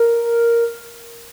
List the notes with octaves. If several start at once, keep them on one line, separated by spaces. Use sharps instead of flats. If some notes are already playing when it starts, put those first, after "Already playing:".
Already playing: A#4